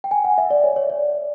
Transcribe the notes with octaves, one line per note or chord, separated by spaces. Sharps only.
G5
G#5
F#5
E5
D5
C#5
C#5
D5